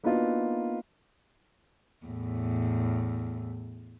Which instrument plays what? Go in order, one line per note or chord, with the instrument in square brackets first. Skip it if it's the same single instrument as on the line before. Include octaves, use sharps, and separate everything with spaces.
[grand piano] A#3 B3 D4 D#4 F4 F#4
[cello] E2 A2